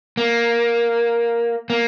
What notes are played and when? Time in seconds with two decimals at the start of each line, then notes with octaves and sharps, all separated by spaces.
0.17 A#3
1.70 A#3